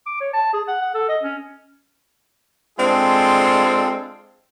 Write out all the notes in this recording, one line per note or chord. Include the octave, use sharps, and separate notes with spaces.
D6
C#5
A5
G#4
F#5
F#5
A4
D#5
C#4
G#3 C4 D4 F4 G#4 A4